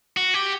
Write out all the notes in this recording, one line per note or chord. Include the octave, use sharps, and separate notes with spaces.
F#4
G4